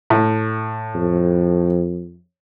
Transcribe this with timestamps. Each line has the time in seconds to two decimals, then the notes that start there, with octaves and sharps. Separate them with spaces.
0.10 A2
0.95 F2